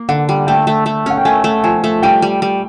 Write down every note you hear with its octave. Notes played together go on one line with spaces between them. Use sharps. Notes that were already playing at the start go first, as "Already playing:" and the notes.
Already playing: A#3
D3 F#5
G3
A3 G5
A3
A3
C#4 F#5
G5
A3 G#5
A3
F3 G#5
A3
G3 G5
G3
G3